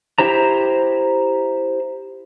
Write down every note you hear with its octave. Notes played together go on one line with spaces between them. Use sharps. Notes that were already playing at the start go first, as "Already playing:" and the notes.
E4 G4 C5 A#5